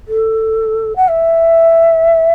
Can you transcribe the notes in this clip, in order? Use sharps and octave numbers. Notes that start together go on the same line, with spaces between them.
A4
F#5
E5